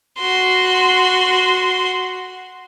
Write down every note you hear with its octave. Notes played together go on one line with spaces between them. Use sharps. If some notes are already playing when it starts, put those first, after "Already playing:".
F#4 C6